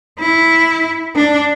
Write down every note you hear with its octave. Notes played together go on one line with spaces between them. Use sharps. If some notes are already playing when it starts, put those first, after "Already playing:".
E4
D4